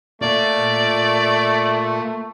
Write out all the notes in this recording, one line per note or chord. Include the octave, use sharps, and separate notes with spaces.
A3 A#3 F4 D5